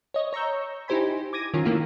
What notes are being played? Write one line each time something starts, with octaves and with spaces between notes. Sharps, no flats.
C#5 D#5
C#5 A#5 C#6 E6 G6
D#4 E4 G4 C5 G#5 B5
D6 G#6 A#6 D#7
D#3 F#3 C#4 F4
D#3 A3 A#3 E4 F4